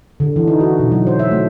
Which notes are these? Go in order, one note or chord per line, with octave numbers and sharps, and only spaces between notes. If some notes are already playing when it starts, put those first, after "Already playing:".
D3
E3
D#4
F#4
B2
F#3
C5
E5
A3